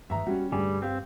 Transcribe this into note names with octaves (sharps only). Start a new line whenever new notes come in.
G2 D#3 E5 A#5
G3 C#4 F#4
D2 G2 G3 G#4 G#5
C4 G4 F5